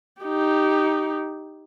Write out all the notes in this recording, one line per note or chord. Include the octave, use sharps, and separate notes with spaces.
D#4 G4